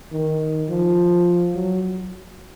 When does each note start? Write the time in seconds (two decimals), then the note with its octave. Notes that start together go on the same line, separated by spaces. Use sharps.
0.12 D#3
0.69 F3
1.55 F#3